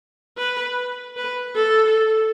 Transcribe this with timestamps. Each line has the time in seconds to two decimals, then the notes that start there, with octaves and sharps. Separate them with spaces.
0.38 B4
1.17 B4
1.55 A4